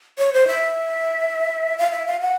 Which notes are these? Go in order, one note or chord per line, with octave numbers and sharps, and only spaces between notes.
C#5
C5
E5
F5
E5
F5
F#5